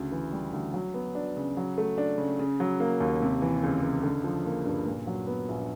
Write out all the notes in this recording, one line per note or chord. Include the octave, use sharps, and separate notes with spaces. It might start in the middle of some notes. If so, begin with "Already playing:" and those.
Already playing: D2 C#3
E3
G3
D2
F#3
B3
D4
C#3
F#3
A3
D4
C#3
C#3
F#3
A#3
D#2
C3
E3
C#2
C#2
D3
F3
A#3
G2
A#2
F#3
B3
A#1